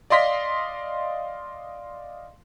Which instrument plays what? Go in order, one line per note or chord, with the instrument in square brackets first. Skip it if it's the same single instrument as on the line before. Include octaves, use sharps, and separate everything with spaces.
[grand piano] D5 D#5 F5 C6 A#6 B6